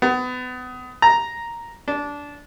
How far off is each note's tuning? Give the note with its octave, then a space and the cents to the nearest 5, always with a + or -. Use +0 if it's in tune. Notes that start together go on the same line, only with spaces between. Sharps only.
B3 +30
A#5 +0
D4 -15